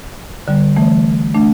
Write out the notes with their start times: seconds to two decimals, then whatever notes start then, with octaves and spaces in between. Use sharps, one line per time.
0.48 D3 G3
0.77 E3 A3
1.34 A3 D4